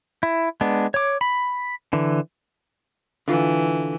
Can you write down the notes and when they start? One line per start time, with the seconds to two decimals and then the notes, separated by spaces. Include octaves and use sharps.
0.23 E4
0.61 G#3 B3 D4
0.94 C#5 D6
1.21 B5
1.93 D3 E3
3.28 D3 E3 F4